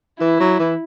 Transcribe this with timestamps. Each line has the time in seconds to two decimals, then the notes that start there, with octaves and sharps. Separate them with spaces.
0.20 E3 E4
0.40 F#3
0.59 E3